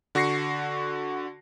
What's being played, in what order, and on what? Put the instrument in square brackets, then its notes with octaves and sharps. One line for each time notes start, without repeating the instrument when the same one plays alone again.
[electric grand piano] D3 F#4 C#6 A#6 C7 C#7